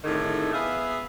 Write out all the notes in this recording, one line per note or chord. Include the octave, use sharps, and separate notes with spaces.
F2 A2 D3 D#3 D#4 G#4
B3 G#4 B4 E5 F5